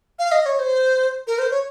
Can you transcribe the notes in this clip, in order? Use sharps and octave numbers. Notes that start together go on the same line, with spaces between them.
F5
D#5
C#5
C5
A#4
C5
C#5